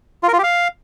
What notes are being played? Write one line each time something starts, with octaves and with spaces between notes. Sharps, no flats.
F4
A#4
F4
G4
F5